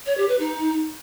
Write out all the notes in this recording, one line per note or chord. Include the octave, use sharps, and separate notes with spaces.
C#5
G4
B4
D#4